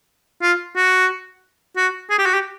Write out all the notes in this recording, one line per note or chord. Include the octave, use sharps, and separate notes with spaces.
F4
F#4
F#4
G#4
G4
F#4
G4